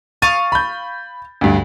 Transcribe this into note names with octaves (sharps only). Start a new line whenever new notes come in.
F5 C#6 D#6 A6
B5 G6
D2 G2